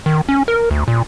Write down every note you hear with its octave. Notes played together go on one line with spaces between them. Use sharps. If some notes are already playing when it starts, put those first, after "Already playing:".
D#3
C#4
A#4
D2
A#2